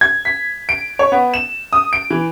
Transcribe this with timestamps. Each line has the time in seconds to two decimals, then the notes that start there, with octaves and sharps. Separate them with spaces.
0.01 G#6
0.25 B6
0.69 D7
0.99 C#5
1.12 B3
1.34 E7
1.73 D#6
1.93 D7
2.10 E3